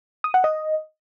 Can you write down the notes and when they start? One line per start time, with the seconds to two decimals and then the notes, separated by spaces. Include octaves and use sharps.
0.24 D#6
0.34 F#5
0.44 D#5